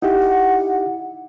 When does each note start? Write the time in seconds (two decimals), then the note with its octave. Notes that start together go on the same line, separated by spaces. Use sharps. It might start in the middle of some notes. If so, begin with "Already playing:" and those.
0.02 D#4 E4 G4 F#5